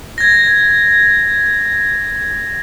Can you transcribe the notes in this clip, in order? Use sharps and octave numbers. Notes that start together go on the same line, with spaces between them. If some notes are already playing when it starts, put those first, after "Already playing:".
G#6 A#6